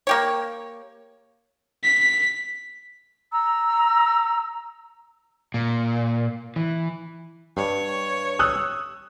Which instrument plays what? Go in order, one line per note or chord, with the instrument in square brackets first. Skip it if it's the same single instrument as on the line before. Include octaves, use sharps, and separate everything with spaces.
[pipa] A#3 G4 C#5
[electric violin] B6
[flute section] A#5 E6
[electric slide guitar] A#2
E3
[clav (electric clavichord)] G2 [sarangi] C#5
[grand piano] D#6 E6 F#6